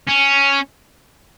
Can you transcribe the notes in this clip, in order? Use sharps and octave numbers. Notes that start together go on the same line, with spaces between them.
C#4